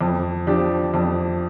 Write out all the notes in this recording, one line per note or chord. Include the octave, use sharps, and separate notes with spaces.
F2
F3 D4 G4
F2